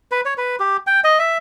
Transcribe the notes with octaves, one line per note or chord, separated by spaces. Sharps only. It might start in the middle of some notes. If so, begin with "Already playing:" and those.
B4
C#5
B4
G4
G5
D#5
E5